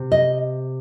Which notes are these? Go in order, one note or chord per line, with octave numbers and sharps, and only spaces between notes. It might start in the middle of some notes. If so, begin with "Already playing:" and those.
Already playing: C3
D#5